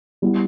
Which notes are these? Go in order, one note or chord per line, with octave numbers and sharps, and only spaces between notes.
G3 B3 E4